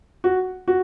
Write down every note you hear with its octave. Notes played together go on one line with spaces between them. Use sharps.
F#4
F#4